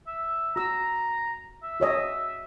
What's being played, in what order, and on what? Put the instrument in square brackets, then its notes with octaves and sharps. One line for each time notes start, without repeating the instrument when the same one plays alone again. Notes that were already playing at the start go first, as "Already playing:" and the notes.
[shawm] E5
[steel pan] F#4 E6 [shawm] A#5
[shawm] E5
[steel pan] F#4 C#5 D#5